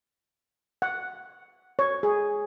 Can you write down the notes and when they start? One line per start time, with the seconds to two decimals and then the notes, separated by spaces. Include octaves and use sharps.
0.82 F#5
1.79 C#5
2.03 G#4